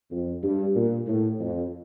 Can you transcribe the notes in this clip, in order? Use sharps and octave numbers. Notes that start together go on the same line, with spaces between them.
F2
G2
A#2
A2
F2